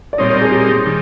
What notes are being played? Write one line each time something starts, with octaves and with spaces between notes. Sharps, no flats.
D5
A#2 G3 C4 D#4 C#5
C#5
G#4
G4
D#3 G3